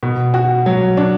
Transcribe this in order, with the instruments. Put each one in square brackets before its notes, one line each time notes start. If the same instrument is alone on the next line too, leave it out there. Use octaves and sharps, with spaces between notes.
[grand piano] B2
F#4
F#3
D4